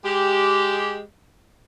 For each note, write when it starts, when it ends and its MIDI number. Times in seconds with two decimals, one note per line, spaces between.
0.04 1.01 56
0.04 1.01 67